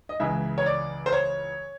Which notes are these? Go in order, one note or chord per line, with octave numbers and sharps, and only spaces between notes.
D#5
C#2 C#3 E3 G#3 E5
C#5
D5
C5
C#5